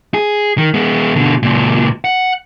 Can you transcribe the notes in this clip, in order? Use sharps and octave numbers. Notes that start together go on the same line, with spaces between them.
G#4
D#3
G#3 B3
B2 D3
C#2 A#2
F#5